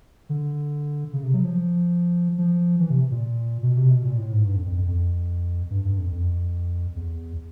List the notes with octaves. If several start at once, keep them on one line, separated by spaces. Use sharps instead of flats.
D3
C#3
C3
F#3
F3
F3
E3
C3
A#2
B2
C3
B2
A#2
A2
G#2
G2
F2
F2
F2
F2
G2
G2
F2
F2
E2